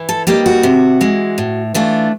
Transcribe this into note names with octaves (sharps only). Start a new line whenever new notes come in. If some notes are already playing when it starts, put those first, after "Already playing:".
Already playing: E3
A4
G3 A#3 D#4 G4
F#4
C3
E3 G#3
A2
E3 A3 D4 F4